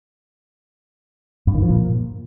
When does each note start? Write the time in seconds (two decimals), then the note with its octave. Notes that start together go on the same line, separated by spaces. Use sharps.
1.47 G2
1.55 D#3
1.62 F3
1.70 A#2